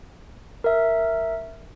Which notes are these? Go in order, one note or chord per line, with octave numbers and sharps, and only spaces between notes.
A#4 E5